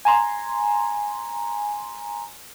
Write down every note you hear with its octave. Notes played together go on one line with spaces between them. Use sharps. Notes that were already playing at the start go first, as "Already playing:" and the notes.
G#5 A#5 C6